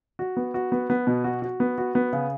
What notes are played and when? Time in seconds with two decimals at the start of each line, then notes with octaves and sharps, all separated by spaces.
0.19 F#4
0.37 B3
0.54 F#4
0.72 B3
0.90 B3
1.07 B2
1.24 F#4
1.42 F#4
1.60 B3
1.78 F#4
1.95 B3
2.13 C#3